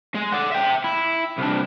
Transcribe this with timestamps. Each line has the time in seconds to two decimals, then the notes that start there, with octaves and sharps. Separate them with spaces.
0.15 G#3
0.33 D5 F#5
0.52 E5 G5
0.84 E4
1.39 C2 D4